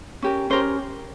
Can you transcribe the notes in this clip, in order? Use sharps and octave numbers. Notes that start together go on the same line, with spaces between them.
C#4 G4 A#4
C#4 G4 A#4 C5